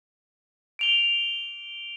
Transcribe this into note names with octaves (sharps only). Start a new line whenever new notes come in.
D7 F7 G7